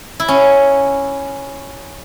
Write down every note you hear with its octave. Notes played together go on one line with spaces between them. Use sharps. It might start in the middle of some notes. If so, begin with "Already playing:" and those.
E4
C#4